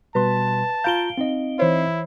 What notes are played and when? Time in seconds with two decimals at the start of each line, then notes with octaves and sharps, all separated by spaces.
0.15 B2 G3 B4 A5 C6
0.84 F4 F5 A#5 G6 D7 G7
1.18 C4 D#4 D#5
1.59 E3 E4 C5 C#5